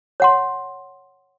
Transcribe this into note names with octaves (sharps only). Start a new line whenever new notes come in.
C#5 F#5 C6